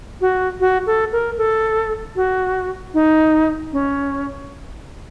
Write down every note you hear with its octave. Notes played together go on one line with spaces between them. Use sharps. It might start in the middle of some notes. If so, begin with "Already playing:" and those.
F#4
F#4
A4
A#4
A4
F#4
D#4
C#4